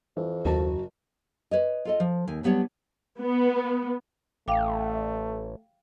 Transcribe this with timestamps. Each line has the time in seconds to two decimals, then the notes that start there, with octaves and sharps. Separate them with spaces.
0.17 F2 E3
0.45 F#1 D#2 F#4 A5
1.51 B4 C#5 D#5
1.85 F4 A4 D#5
2.00 F3
2.27 D#2 G#5
2.43 F#3 G3 B3 D4 C#5
3.19 B3
4.48 A1 A3 F5 G5 D6